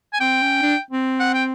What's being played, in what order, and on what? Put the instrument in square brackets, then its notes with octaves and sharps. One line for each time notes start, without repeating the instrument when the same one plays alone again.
[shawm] G#5
[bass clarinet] C4 [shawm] G5
[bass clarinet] C#4
D4
C4
[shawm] F#5
G5